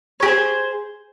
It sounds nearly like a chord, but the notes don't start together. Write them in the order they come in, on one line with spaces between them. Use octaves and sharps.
C#5 G4 G#4 C5